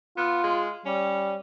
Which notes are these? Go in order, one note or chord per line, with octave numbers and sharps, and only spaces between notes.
B3 F4
G#3
G3 C#4